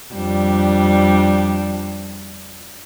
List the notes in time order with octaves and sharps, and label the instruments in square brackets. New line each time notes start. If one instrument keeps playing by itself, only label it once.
[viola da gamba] F2 G3 D4